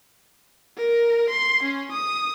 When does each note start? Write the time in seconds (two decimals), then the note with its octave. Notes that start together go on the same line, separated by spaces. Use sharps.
0.77 A#4
1.30 C6
1.63 C#4
1.92 D#6